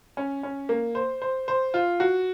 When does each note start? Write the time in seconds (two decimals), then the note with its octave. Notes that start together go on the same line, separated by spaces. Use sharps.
0.17 C#4
0.43 C#4
0.69 A#3
0.95 C5
1.22 C5
1.48 C5
1.74 F4
2.00 F#4